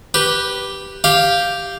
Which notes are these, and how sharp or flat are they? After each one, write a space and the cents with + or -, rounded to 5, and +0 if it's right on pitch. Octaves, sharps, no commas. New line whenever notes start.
G4 -5 B4 -10
G4 +0 F5 +0